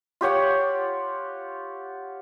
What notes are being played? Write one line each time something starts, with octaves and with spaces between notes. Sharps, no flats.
F4 G4 C#5 F#5